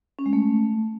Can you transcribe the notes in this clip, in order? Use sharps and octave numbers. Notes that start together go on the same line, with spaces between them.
C#4
G#3
A3